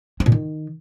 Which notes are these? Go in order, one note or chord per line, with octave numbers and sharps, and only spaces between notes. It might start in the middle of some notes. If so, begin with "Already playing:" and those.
C4
A#2
D#3